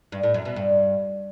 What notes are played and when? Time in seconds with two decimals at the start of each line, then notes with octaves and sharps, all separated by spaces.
0.12 G2
0.23 A2
0.34 F#2
0.45 B2
0.56 G2